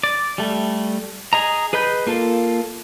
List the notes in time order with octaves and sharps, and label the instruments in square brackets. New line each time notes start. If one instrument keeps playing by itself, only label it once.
[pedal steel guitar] D5
G3 A3
G#4 D#5 A#5
G#4 B4 D#5 B5 G6
A#3 F4 A4